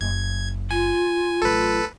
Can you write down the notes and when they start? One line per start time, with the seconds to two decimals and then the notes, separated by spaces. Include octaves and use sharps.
0.01 F#1 G#6
0.71 F4 G#5
1.42 A1 F#3 A4 B4